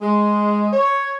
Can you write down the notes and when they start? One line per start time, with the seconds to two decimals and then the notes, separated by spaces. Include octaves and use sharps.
0.02 G#3
0.72 C#5